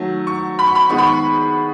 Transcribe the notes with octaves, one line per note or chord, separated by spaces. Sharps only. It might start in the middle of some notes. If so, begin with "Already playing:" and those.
Already playing: D#3 F#3 A3
C#6
B5
C#6
B5
D#3 G#3 B3 C#6
B5
C#6